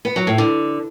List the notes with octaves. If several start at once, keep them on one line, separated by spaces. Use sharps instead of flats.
B3
F#3
A2
D3